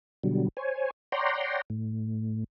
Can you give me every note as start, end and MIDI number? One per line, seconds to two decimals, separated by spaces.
0.23 0.48 47
0.23 0.48 50
0.23 0.48 54
0.23 0.48 55
0.57 0.91 72
0.57 0.91 73
0.57 0.91 80
1.12 1.61 73
1.12 1.61 74
1.12 1.61 78
1.12 1.61 79
1.12 1.61 82
1.12 1.61 84
1.70 2.44 45